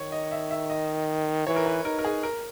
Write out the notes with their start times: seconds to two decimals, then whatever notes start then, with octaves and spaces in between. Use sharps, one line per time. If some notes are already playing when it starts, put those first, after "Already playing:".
Already playing: D#3 C#5
0.12 D#5
0.31 E5
0.51 E5
0.70 D#5
1.47 E3 C#5
1.56 A#4
1.66 B4
1.84 D#4 A#4
1.99 A#4
2.04 G#4
2.23 A#4